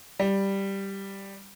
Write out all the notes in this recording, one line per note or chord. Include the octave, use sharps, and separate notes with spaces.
G3